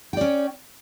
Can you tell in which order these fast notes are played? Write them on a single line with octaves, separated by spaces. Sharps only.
G5 D5 C#4